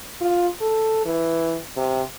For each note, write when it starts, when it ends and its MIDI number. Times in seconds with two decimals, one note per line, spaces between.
0.21 0.48 65
0.61 1.05 69
1.05 1.56 52
1.77 2.02 48